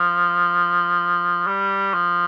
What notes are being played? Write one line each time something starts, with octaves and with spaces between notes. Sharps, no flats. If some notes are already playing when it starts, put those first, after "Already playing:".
Already playing: F3
G3
F3